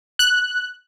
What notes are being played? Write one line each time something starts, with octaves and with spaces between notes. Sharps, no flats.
F#6